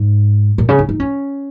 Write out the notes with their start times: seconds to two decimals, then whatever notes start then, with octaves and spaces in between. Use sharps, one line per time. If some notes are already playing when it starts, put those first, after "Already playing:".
Already playing: G#2
0.58 A#2
0.69 C#3
0.79 D#4
0.89 D#4
1.00 C#4